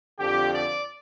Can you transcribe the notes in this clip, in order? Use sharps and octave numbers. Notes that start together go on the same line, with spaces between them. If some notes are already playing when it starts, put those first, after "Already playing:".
F2 D3 F3 G4
D5